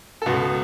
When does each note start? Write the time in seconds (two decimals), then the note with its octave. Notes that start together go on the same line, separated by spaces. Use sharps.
0.22 A4
0.26 C#2 B2 B3 F#4